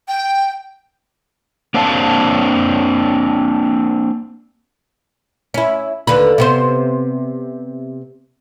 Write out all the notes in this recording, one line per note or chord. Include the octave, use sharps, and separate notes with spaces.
G5
A#3 C4 D4 F5 A5
C#4 E4
D#2 D3 B4
C3 B3 C5